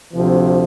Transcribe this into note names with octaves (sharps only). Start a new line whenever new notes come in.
D2 C3 F3